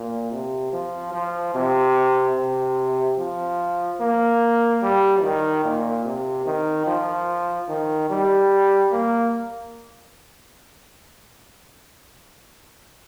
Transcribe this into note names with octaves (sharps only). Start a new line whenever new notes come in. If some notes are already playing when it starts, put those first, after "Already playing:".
Already playing: A#2
C3
F3
F3
C3
C3
F3
A#3
G3
D#3
A#2
C3
D#3
F3
D#3
G3
A#3